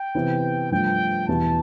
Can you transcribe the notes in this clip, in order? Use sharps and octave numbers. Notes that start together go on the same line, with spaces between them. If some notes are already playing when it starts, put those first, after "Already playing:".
Already playing: G5
C3 E3 B3
G2 F3 A3 G5
E2 B2 B3 E4 G4 A5